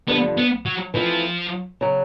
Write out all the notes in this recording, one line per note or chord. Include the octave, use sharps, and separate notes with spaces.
G2 D3 F3 B3
B3
F#3
E3 F3 A3 C4
C#3 F#3